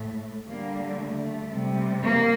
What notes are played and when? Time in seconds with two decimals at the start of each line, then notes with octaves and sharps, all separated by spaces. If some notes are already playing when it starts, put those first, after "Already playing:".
Already playing: A2 A3
0.47 D3 G3 A#3
0.99 A3
1.51 C3 G3
2.03 A#3